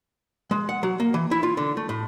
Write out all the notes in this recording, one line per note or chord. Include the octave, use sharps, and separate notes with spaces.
G#3
F#5
F#3
A#3
E3
E4
F4
D3
A3
A2